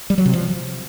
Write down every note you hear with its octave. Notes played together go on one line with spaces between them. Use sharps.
G3
F#3
C3
F3